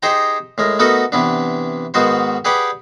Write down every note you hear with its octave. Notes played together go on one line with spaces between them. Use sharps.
D#4 G4 G#4 C5 G5 A#5
A2 G#3 A#4
A3 B3 D#4 F#4 A4 A#4
C3 E3 B3 D4
G#2 D#3 B3 F#4 C5
G4 G#4 B4 D5 F#5 G5